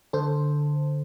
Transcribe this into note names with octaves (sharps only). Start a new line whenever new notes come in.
D3 A4 C5